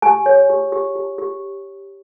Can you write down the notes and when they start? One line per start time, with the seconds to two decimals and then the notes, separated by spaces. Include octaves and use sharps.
0.02 G4 G#5
0.26 C#5
0.50 G4
0.72 G4
0.96 G4
1.18 G4